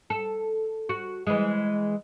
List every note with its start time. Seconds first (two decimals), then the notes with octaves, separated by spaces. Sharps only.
0.10 A4
0.89 F#4
1.27 E3 G#3